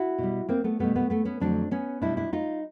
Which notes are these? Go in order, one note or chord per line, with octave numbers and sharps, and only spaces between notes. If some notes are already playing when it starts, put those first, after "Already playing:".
Already playing: E4 F#4
B2 G3
A#3 C4
A3 B3
B2 G3 A3 B3
A3 B3
A3 B3
B3 C#4
F2 D3 F#3 A3 C4 D4
B3 C#4
B2 G3 D4 E4
D4 E4
D#4 F4